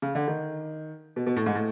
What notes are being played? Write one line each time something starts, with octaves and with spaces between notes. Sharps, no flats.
C#3
D3
D#3
B2
B2
A2
G#2
A2